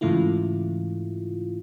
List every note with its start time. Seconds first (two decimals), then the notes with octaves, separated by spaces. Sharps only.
0.01 G#2 C#3 E3 A3 E4 F4